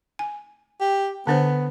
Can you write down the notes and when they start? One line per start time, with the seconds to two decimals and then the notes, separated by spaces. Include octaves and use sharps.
0.19 G#5
0.81 G4
1.27 D3 B3 D4 C5